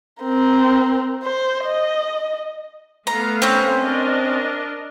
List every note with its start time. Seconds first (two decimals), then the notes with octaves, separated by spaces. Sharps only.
0.22 C4 A#4
1.23 C5
1.64 D#5
3.07 A3 B3 F5 A#5
3.42 C4 C#4
3.80 D4 A#4 D#5